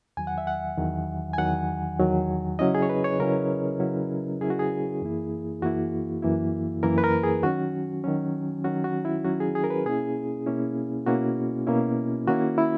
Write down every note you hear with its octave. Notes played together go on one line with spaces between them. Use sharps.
E2 D#3 F#3 G#5
F#5
E5
F#5
E2 D#3 F#3
G#5
E2 D#3 F#3 F#5
E2 D#3 F#3
C#3 F#3 C#4 E4 D#5
G#4
C#5
B4
C#5
C#3 F#3 C#4 E4 A#4
C#3 F#3 C#4 E4
C#3 F#3 C#4 E4 G#4
F#4
G#4
F#2 E3 A#3 E4
F#2 E3 A#3 E4 F#4
F#2 E3 A#3 E4
F#2 E3 A#3 E4 A#4
B4
A#4
G#4
D#3 F#3 C#4 F#4
D#3 F#3 C#4
D#3 F#3 C#4 F#4
F#4
E4
D#3 F#3 C#4 F#4
G#4
G#4
A#4
B4
B2 A#3 C#4 E4 G#4
B2 A#3 C#4 E4
B2 A#3 C#4 E4 F#4
B2 A#3 C#4 E4
D#3 A#3 C#4 E4 F#4
E4